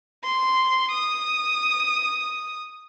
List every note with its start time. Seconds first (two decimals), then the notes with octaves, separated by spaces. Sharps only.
0.24 C6
0.91 D#6